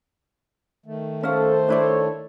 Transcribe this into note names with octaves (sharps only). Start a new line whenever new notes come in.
D#3 A3
C#4 A4 C5 F5
D4 E4 A4 C#5 D5